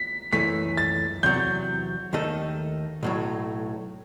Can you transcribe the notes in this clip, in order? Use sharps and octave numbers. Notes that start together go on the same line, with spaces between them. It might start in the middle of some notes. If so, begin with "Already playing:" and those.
Already playing: B6
F#2 E3 A3 B6
A6
E2 C3 F#3 G6
D#2 D#3 A3 D#4 A4
B1 A2 F#3